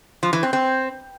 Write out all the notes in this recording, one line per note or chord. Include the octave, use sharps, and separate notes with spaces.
F3
E3
C4
C4